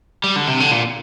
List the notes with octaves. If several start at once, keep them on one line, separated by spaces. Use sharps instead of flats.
G3
D3
C3
D3
A#2